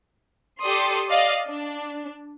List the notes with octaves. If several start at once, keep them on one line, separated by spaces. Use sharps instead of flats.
G4 A4 D5 C6 D#6
D5 D#5 F5
D4